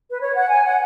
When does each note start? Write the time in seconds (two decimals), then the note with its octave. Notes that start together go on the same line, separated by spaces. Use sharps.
0.10 B4
0.21 C#5
0.35 F#5
0.50 G#5
0.64 F#5